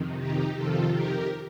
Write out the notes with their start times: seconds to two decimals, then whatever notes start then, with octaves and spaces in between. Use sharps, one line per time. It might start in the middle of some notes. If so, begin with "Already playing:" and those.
Already playing: F2 C3 D#3
0.19 D#4 G4
0.56 F2 C3 D#3 F4 A4
0.93 G4 A#4